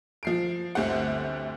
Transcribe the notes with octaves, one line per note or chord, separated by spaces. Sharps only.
F3 C7 D7
G1 D2 C4 G4 F#5